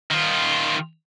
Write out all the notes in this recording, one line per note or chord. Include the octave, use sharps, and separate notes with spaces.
D#3 F4